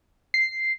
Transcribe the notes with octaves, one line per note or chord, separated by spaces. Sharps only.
C7